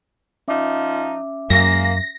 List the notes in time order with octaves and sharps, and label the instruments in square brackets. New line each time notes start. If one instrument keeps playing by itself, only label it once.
[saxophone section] F3 D#4 [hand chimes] C#4 E5 D6
[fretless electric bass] F#2 [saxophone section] G#3 A#3 [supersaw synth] A#6